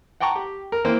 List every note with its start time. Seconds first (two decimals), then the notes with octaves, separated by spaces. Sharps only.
0.20 F#5 G5 A5 A#5 C#6
0.35 G4
0.72 A#4
0.85 E3 A#3 C4 C5